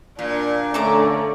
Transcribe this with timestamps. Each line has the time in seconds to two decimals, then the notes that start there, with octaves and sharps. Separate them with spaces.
0.19 A#2 D4
0.74 D3 A3 C#4 D5 A5 A#5 D6